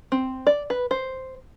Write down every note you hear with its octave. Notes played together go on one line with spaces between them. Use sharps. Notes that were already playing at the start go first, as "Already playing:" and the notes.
C4
D5
B4
C5